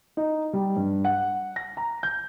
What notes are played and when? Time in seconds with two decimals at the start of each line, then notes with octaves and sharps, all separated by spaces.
0.17 D#4
0.53 G3
0.76 G2
1.05 F#5
1.56 A#6
1.77 A#5
2.03 G6